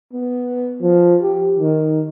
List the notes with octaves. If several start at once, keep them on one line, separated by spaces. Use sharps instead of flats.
B3
F3
G4
D#3